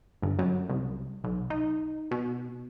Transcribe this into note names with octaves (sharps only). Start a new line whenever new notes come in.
G1
F#2
C2
B1
D#4
B2